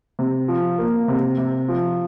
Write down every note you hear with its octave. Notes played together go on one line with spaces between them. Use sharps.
C3
F3
A#3
C3
C3
F3